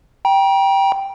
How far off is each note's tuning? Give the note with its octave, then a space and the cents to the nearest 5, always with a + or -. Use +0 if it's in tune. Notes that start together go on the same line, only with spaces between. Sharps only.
G5 +0 A#5 +40